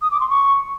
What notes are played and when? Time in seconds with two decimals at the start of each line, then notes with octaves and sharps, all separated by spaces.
0.02 D#6
0.11 D6
0.20 C6
0.30 C#6